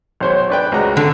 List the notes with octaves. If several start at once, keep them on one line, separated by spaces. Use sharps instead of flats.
B1 C5 C#5
D4 B4 G5
C#2 F#4 A#5
D3